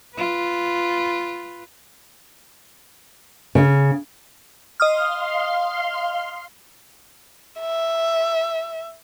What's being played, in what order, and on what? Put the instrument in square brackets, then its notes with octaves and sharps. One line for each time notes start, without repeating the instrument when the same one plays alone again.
[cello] F4 B4
[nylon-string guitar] C#3
[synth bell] D#5 D#6 F6 [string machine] F5 C6
[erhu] E5